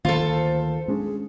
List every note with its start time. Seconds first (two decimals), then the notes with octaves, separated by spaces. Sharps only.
0.05 D2 D#3 A#3 F4 A4 C5
0.88 G#3 C#4 D4 G#4